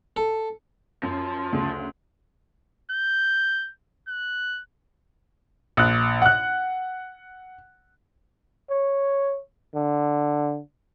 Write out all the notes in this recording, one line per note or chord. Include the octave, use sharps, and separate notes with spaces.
A4
F#2 F3
D2 C#3
G6
F#6
A#1 F#6
F#5 F#6
C#5
D3